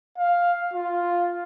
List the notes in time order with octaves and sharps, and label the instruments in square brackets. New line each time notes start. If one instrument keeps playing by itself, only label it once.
[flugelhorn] F5
F4